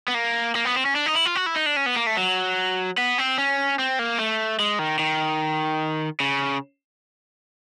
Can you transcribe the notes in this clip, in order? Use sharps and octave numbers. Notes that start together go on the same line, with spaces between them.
B3
A#3
A#3
B3
C4
C#4
D4
D#4
E4
F4
F#4
E4
D#4
D4
C#4
B3
A#3
A3
F#3
B3
C4
C#4
C4
A#3
A3
G#3
D#3
D#3
C#3